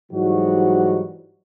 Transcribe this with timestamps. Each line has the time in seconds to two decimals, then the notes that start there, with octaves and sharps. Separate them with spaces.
0.12 G#2 E3 F#3 G3 D#4 F#4